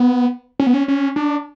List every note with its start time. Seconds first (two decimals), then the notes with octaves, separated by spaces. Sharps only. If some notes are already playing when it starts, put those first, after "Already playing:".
Already playing: B3
0.60 C#4
0.67 B3
0.74 C#4
0.88 C#4
1.16 D4